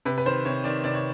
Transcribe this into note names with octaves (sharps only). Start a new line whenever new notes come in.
C3 B4
B4
D#3 C5
C3 C#5
D#3 D5
C3 D5
C#5